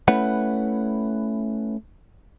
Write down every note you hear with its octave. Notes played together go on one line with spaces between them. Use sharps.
A3 C#4 E4 B4 F#5